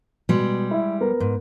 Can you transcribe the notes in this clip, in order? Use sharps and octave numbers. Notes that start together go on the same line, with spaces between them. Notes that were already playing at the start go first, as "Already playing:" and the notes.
B2 G3 G#3
E4
B3 A#4
G#2